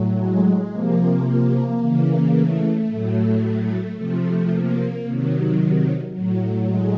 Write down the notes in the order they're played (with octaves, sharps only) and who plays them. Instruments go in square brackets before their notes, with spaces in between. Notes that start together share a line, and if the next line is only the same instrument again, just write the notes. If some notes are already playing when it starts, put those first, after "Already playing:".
Already playing: [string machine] A2 F#3
G#3
C3 F3 A#3
A#3
C#3 E3
A3
A2 F#3
C3 F3 A3
A#3
C3 D#3 F#3
A2 F#3
G#3